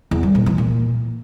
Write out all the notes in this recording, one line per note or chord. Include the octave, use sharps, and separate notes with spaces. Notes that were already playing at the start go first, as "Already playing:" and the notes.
E2
G3
A#2
E3
A#2